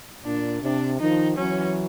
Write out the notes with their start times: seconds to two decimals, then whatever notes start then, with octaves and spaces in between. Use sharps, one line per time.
0.25 A#2 D4
0.62 C3 D4
1.00 D#3 F3 D#4
1.37 E3 F#3 C#4